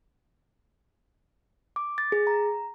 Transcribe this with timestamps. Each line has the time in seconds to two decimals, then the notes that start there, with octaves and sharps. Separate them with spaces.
1.76 D6
1.98 A6
2.12 G#4
2.27 A#5